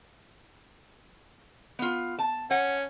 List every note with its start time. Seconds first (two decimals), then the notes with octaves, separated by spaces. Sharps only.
1.79 B3 F4
2.19 A5
2.51 C#4 F#5